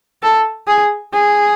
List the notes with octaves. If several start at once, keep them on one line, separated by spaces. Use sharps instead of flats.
A4
G#4
G#4